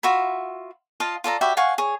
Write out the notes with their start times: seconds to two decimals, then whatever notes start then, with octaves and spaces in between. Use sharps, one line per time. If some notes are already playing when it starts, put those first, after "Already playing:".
0.03 F4 F#4 E5 B5
1.00 F4 D#5 F5 A5
1.24 F4 A4 D5 A#5
1.41 F#4 G4 E5 B5
1.57 F5 F#5 G#5 C#6
1.78 G#4 C#5